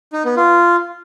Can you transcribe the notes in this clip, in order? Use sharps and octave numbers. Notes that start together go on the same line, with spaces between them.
D#4
B3
F4